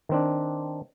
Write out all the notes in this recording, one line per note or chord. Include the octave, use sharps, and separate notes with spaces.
D#3 C4 D4